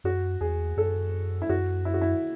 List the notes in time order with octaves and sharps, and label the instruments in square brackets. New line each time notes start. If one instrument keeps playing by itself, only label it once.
[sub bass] F#2 [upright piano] F#4
[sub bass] E2 [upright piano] G#4
[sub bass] F#2 [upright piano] A4
[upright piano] E4
[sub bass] F#2 [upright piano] F#4
[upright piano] E4
F#4
E4